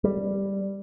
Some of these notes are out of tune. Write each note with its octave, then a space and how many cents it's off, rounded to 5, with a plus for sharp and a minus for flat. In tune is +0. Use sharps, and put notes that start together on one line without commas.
G3 +0